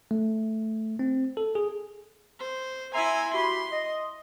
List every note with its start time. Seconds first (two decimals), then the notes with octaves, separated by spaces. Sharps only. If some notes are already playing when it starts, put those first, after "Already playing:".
0.11 A3
0.99 C4
1.37 A4
1.55 G#4
2.40 C5
2.94 E4 E5 G#5 A#5 C6
3.33 F#4 G4 B5 C6
3.72 D#5